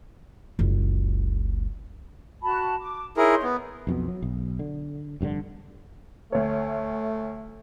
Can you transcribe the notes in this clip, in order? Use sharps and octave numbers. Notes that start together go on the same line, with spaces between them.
F#1 C#2
F#4 A5 B5
D6
D#4 E4 G#4 A#4 C#5 C6
B3
B1 F2 B2 B3
F#3
B1
D3
F1 G2 B2 D3
D2 A3 C#5